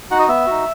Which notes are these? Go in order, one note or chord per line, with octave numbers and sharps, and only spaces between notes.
D#4 F#4 F#5
D#5
B3 E5
D#4 F#4